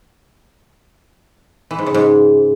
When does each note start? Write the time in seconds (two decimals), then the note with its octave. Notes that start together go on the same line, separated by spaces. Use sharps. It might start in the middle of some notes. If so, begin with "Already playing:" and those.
1.71 E3
1.79 G#2
1.86 C#3
1.94 G#2